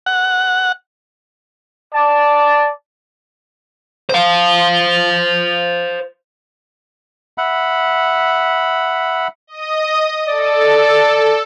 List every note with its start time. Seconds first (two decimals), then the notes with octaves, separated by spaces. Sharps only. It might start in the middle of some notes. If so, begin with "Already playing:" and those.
0.06 F#5
1.94 D5 A5
4.09 C5 F5
7.38 E5 F#5 B5
9.47 D#5 D#6
10.28 A4 D5